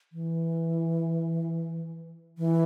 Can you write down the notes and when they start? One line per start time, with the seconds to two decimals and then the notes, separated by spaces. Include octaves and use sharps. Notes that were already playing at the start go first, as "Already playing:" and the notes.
0.13 E3
2.38 E3